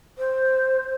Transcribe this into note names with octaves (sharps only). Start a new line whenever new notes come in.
C5